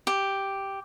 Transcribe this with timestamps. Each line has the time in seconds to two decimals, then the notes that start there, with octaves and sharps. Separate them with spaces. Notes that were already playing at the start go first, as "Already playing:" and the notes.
0.07 G4